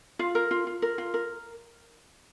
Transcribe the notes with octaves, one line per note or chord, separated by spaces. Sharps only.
F4 F5
A#4
F4
F4
A#4
F4
A#4